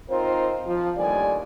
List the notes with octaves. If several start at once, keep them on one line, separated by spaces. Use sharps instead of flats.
C4 D#4 F4 A#4 C5
F3
D#2 A2 D3 G3 D5 G#5